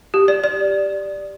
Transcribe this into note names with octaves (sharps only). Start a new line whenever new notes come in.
G4
D5
D5